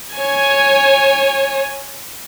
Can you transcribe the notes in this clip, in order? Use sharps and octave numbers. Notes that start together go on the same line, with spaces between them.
C#5 G#5